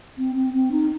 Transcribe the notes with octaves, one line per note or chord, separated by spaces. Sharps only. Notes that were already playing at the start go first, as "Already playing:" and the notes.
C4
C4
C4
D#4